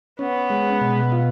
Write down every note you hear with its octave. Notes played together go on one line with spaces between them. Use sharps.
B3 C#4
G#3
B2
F4